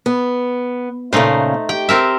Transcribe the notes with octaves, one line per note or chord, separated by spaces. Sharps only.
B3
A#2 C#3 A3 D#4 C5
G4 G5
C4 A#4 E5